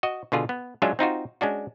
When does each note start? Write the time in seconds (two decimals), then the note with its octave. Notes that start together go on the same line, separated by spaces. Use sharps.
0.03 F#4 D#5
0.32 B2 D3 F4 G#4
0.49 B3
0.82 F#3 G#3 C#4 D4 F4 E5
0.99 C4 D#4 F4 F#4
1.41 G#3 C#4 D4 F#4